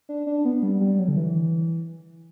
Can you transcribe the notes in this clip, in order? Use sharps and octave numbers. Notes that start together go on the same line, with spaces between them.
D4
D4
B3
G3
G3
F#3
D3
E3